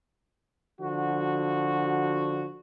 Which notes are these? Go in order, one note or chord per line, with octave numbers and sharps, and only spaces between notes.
D3 F3 F#4